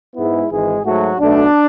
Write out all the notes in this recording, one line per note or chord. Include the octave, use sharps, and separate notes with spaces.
G#2 G#3 B3 E4
G#1 G#2 E3 G#3 G#4
G#2 F#3 A3 F#4
B1 B2 A3 D4